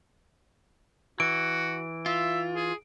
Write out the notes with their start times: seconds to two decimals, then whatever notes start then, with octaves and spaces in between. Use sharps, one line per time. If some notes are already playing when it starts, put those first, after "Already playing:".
1.20 E3 F#4 D7
2.06 F4 E5
2.56 G#4